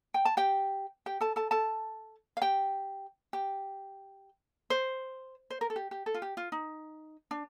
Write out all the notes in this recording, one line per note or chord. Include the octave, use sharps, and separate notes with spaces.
G5
A5
G4 G5
G4 G5
A4 A5
A4 A5
A4 A5
F5
G4 G5
G4 G5
C5
C5
A#4
A4
G4
G4
A4
F4
G4
F4
D#4
D4